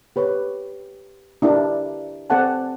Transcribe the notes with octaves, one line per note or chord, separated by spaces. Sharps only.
G4 B4 C#5
D4 E4 G4 A#4
C4 A4 D5 F#5 G#5 A5